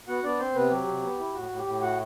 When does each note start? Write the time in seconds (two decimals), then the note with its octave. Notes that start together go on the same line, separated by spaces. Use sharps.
0.08 B3 F#4 F#5
0.24 B3 D4 D5
0.40 C4 C5
0.55 C3 B3 B4
0.71 F#3 G4
0.87 C3
1.03 B3
1.19 E4
1.34 A2 F#4
1.50 A2
1.58 G4
1.66 A2
1.82 A3 F#4 F#5